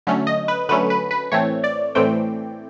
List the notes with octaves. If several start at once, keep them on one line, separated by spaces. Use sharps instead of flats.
D3 F#3 A3 C#4
D#5
B4
D3 F#3 A3 C#4 B4
B4
B4
A2 E3 A3 C4 C#5
D5
A2 E3 A3 C4 G5